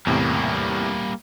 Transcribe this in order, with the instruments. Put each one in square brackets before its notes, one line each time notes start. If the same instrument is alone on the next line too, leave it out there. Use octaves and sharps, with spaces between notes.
[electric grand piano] E2 A2 C3 [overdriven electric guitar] G3 A#3